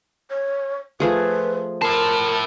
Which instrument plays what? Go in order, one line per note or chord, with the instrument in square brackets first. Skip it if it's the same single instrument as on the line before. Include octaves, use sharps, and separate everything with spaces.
[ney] C#5
[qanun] F3 A3 G#4 [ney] B4
[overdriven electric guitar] E4 A5 [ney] A#4 [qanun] C6